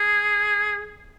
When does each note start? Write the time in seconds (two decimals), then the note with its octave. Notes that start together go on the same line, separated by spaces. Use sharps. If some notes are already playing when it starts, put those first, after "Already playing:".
Already playing: G#4